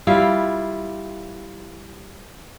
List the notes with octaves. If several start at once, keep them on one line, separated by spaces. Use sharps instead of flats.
G3 E4 F4 F5